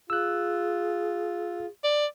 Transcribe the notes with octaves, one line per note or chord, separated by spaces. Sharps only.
F4 G#4 E6 F#6
D5